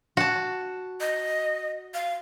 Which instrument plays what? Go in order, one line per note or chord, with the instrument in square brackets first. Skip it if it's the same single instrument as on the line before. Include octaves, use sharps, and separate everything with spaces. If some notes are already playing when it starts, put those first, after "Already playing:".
[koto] F#4 A5
[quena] D#5
F5